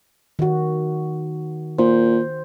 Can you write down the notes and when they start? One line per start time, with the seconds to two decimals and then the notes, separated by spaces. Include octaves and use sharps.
0.39 D#3 F#4
1.79 A#2 C5